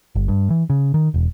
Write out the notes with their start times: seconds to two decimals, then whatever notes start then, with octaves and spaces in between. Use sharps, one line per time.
0.15 G1
0.28 G2
0.50 E3
0.70 C#3
0.94 D#3
1.14 E1